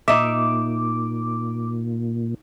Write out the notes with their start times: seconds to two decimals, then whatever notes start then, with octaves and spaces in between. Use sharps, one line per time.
0.08 A#2 D#4 E5 D6